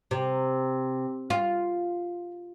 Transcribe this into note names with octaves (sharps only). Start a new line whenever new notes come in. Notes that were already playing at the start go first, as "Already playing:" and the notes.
C3
F4